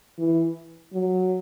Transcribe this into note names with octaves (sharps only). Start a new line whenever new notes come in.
E3
F#3